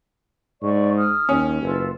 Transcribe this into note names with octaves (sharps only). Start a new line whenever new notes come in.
G#2 D5 C#6
D#6 F6
D#2 C#4
F#1 F4 A4 B4